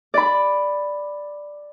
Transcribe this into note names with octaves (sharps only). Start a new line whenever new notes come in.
D5 B5